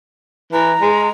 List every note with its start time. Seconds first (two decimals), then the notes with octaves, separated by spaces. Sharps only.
0.53 E3 A#5
0.82 G#3